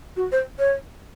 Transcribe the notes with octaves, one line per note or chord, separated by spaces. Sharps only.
F#4
C5
C#5